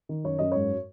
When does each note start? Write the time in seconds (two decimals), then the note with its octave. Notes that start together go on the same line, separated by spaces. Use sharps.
0.09 D#3
0.24 F#2 C#5
0.39 F#2 D#5
0.52 G#2 C#5